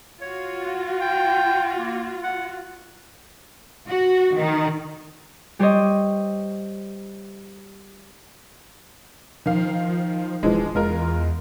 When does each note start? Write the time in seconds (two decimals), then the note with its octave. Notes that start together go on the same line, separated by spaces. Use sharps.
0.21 F4 F#4 C#5
1.01 G5
1.78 A#3
2.24 F#5
3.87 F#4
4.36 D#3
5.59 G3 G4 C5 C#5 D#5
9.46 D#3 F3 F5
10.43 D1 E3 F3 G#3
10.75 E2 G#3 F4 A#4